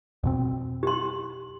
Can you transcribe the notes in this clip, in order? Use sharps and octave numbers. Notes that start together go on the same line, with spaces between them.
F2 B2 C4
G4 C6